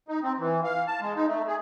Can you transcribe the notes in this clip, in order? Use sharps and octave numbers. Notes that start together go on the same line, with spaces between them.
D#4
C4
E3
F5
A5
G#3
D#4
A3
G#4